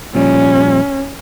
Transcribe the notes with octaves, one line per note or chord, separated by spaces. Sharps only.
A#2 F3 G3 C#4